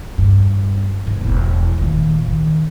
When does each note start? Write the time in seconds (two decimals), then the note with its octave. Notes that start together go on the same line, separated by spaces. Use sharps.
0.18 G2
1.07 G#2
1.21 E1 E4
1.78 A#2 D#3
2.28 D#3